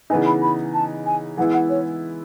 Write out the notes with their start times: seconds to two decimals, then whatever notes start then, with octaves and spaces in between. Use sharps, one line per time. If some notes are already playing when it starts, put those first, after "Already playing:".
0.10 C#3 E3 B3 D#4 G#5
0.26 B5
0.42 B5
0.74 A5
1.06 G#5
1.37 E3 G#3 B3 E4 F#5
1.54 F#5
1.70 C#5